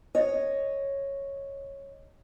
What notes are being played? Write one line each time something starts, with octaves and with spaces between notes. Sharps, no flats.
C#5 D#5